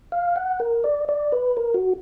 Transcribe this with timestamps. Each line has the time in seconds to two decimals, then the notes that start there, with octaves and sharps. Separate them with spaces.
0.12 F5
0.36 F#5
0.60 A#4
0.84 D5
1.09 D5
1.32 B4
1.57 A#4
1.74 F#4